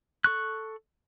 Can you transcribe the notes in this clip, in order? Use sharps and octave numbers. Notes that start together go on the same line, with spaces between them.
A4 C#6 F#6